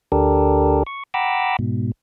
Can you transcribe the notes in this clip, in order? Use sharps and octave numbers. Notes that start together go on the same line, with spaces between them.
D2 D4 G4 A4 A#4
C#6
F#5 G5 A#5 B5 D6 E6
G#2 B2